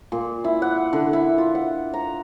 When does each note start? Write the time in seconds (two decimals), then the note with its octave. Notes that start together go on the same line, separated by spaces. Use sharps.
0.12 A#2
0.44 E4
0.62 F#5
0.93 D3
1.13 E4
1.38 F4
1.55 F#5
1.94 A#5